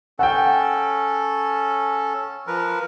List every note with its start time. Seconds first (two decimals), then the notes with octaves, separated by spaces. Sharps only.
0.19 C#4 A4 F#5 G5
2.47 F3 A#4 B4